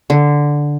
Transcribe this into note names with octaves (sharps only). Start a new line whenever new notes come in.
D3